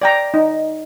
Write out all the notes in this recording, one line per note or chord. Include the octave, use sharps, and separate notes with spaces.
D5 G5 A#5
D#4